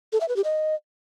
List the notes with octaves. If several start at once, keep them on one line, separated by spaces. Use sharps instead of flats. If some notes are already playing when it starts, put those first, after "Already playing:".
A4
E5
B4
G4
D#5